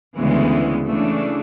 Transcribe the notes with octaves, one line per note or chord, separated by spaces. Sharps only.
D2 C#3 E3 G#3 B3
C#3 E3 A3 D4